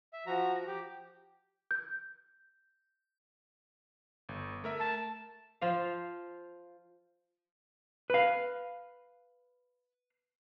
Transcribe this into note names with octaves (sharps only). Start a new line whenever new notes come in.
E5
F3 F#4 A#5
G4
G6
G1
A3 A#4 E5
A5
F3 F4 F5
B4 F5